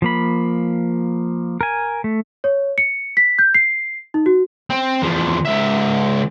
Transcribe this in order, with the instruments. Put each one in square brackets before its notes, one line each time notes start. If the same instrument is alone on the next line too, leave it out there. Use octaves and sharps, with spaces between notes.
[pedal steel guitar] F3 A#3 B5
A#4 G#5
A3
[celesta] C#5
C#7
B6
G6
C7
D#4
F#4
[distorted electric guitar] C4
E2 F3
C#2 E5